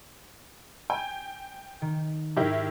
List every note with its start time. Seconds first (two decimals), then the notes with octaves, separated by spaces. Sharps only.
0.90 G5 G#5
1.82 D#3
2.37 G#2 D#3 E4 G4 G5